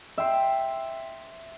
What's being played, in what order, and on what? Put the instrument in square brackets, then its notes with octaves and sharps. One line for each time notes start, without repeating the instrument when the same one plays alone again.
[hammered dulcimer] E5 G5 C6